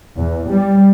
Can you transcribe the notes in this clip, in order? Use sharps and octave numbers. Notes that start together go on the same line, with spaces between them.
E2
G3